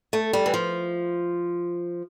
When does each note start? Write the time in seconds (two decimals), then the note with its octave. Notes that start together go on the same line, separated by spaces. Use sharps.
0.13 A3
0.33 G3
0.46 E3
0.54 F3